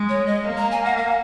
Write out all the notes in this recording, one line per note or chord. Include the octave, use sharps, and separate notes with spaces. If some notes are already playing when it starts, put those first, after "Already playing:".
Already playing: G#3
C#5
D#5
A#3
A#5
G#5
F#5
F5